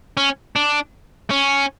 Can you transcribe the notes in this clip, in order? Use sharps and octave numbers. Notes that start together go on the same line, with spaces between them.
C#4
D4
C#4